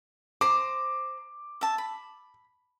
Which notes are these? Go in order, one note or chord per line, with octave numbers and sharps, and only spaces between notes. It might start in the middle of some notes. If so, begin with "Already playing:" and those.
C5 A#5 D6
E5 A5
B5